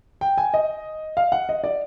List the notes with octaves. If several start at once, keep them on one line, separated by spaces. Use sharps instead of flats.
G5
G#5
D#5
F5
F#5
D#5
D5